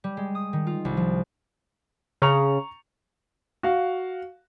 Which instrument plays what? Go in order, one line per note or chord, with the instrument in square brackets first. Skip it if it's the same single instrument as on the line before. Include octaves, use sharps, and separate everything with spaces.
[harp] G3
G#3
D#6
D#3
F4
C2
F3
[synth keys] C#3 [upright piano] A#5 C#6 F7
[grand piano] F#4 F5